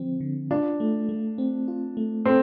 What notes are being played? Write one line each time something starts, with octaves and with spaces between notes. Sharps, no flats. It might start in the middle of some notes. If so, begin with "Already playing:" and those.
Already playing: D3 F3 C4
D3
D4 F4
A3
A3
C4
F4
A3
C4 A4